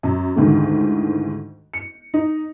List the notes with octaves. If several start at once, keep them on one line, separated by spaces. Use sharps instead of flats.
F#2
D2 G#2 D#3 E3 A3
C#7
D#4